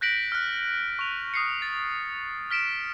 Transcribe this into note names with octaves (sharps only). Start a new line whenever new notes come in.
F#6 G6 A#6 B6 D7 F#7
F6 F#6
C#6 F7
D#6 C7 C#7
A6 C7
F6 B6 D7 E7